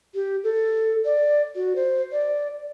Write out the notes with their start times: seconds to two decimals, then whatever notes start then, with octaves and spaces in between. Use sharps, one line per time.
0.15 G4
0.44 A4
1.05 D5
1.56 F#4
1.76 C5
2.12 D5